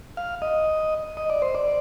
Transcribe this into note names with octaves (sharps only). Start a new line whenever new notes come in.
F5
D#5
D#5
D5
C5
D5